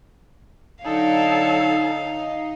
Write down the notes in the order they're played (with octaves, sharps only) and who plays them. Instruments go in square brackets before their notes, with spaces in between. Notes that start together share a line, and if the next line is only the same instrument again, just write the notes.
[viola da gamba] D3 F#3 C#5 [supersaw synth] D#4 [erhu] A4 [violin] F5